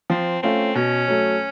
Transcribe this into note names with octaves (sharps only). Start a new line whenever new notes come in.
F3 C4
A3 C4 C#4 F4
B2 C#4
F#3 A3